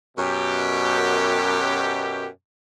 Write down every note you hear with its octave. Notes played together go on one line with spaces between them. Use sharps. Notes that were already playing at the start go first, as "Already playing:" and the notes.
F#2 B2 G4